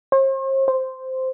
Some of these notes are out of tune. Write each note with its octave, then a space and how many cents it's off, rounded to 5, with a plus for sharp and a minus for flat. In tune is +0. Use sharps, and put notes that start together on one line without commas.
C5 +45
C5 -5